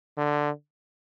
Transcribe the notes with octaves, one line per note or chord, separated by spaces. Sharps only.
D3